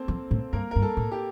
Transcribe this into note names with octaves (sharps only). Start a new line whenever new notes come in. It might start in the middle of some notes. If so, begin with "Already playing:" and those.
Already playing: A#3 C4 A4 C5
F3
A2
G2 A#3 A#4
G2 A#4
A4
A2
G4